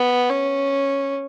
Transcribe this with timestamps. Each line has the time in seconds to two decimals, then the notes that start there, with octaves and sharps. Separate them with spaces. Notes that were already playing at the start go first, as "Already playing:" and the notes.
Already playing: B3
0.30 C#4